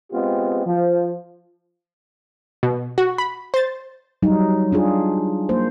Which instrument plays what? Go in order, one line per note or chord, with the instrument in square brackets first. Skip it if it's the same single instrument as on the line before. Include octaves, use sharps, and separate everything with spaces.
[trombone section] G#3 B3 C4 F4 G4
F3
[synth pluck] B2
F#4
B5
C5 A6
[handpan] F#3 G3 D#4
D4 F4 G#4
A#3 C5